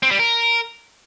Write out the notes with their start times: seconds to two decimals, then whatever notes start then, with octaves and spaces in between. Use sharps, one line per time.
0.03 C4
0.11 G3
0.19 A#4